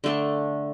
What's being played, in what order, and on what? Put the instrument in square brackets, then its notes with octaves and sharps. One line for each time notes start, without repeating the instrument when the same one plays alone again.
[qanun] D3 A3 D4